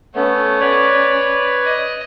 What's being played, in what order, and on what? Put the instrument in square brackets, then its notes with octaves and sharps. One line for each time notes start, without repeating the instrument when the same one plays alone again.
[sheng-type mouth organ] A3 B3 [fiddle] C#4
[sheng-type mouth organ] B4 C#5 D5
[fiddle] D#5